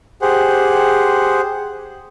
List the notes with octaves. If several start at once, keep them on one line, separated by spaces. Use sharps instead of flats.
G4 G#4 C5 F#5